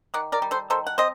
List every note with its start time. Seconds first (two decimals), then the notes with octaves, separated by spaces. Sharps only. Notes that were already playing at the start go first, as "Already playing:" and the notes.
0.14 D#3 D5 F#5
0.32 A#4 D5
0.42 G3
0.51 A4 C5
0.70 D#3 A4 C5
0.87 F#5
0.98 C4 C5 D#5